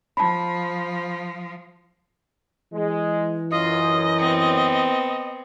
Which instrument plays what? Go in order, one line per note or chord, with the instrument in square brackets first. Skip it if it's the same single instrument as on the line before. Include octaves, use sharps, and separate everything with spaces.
[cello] F3 [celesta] A5 B5
[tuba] E3 [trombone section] G#3
[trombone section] F#2 [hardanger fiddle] F4 [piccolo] D#5
[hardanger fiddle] B3 C4